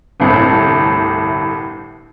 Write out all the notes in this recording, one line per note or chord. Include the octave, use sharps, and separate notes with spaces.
G1 C2 A2